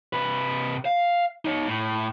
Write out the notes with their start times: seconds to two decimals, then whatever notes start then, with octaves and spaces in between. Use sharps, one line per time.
0.13 C3 B4
0.85 F5
1.45 D#4 C#5
1.67 A2